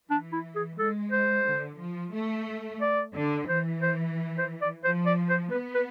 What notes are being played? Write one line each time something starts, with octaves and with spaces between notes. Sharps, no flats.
E3 D4
E4
G#4
G#3 A4
C5
D3
F3
A3
D5
D3
E3 C5
C5
C5
D5
F3 C5
D5
C5
B3 B4
B4